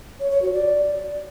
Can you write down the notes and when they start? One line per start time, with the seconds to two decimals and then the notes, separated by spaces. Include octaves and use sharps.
0.20 C#5
0.31 C#5
0.42 F#4
0.53 D5